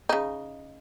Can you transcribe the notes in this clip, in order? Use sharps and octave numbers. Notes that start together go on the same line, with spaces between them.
C#3 D#4